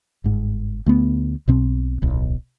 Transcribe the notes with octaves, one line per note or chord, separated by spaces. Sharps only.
G1 G#2
D2 A3 B3
B1 B2 C4
D1 B1